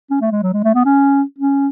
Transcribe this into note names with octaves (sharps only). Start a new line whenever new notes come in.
C#4
A3
G#3
F#3
G#3
A3
B3
C#4
C#4